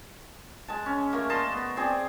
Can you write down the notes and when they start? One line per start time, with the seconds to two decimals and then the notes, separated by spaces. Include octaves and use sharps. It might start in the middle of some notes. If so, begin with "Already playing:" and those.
0.68 G#3 A5
0.86 C#4
1.13 A3 A#3
1.30 D5 D#5 A5 C6
1.52 B3
1.77 C4 G#4 D5